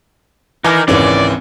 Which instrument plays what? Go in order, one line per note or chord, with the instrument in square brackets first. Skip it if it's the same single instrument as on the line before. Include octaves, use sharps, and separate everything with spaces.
[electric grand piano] E3 [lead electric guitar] D#4 A#4 [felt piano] G#5 D6
[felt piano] G#1 C#4 [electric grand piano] C#2 E3 [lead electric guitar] D5